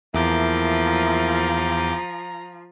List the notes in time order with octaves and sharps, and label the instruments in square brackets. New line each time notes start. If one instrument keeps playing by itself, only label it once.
[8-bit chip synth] E2 D6 G6 [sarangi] F3 [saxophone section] A3 A#3 E4 [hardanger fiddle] A#5